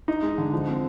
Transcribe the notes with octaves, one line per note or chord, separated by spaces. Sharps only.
D#4
G#3
D3
F3
C4